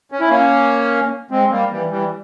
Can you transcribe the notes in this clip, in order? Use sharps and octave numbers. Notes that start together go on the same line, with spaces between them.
C#4
E4
A#3 C#4
G#3 C4
G3 A#3
E3 G3
E3 G3